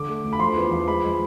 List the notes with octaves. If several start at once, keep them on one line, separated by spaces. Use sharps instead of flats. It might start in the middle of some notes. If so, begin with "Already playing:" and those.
Already playing: D3 D6
A3
D2
B5
F3 C6
E2
F3
G#3 B5
G#3